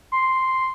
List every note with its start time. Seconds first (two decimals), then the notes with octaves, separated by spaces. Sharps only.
0.12 C6